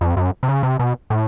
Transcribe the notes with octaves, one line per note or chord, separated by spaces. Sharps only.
F2
F#2
C3
C#3
C3
B2
A2